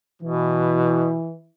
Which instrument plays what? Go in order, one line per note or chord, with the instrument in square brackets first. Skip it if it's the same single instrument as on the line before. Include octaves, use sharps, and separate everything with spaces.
[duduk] B2 [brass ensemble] E3